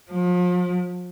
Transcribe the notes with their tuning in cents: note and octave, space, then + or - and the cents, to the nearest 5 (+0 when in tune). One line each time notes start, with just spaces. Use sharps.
F3 +40